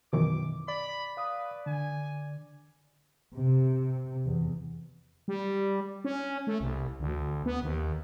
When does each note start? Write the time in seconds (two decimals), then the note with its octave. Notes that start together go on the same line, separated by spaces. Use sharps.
0.13 F#2 B2 D#3 E3 D6
0.68 D5 B5
1.17 B4 F5 D#6
1.66 D3 G#5
3.34 C3
4.26 E2
5.28 G3
6.05 C#4
6.47 A3
6.61 C2
7.00 D2
7.46 B3
7.63 D#2